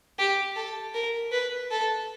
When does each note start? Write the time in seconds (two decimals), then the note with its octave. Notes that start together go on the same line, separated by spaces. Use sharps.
0.19 G4
0.56 A4
0.94 A#4
1.32 B4
1.71 A4